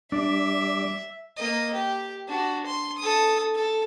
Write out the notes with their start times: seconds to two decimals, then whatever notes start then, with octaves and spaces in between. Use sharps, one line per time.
0.12 G3 D4 D5 E5 D6
1.37 A#3 D#5
1.73 G4
2.28 D4 F#4
2.66 C6
2.98 A4 D#6
3.55 A4